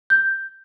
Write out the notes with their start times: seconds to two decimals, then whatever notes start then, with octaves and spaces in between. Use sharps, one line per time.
0.10 G6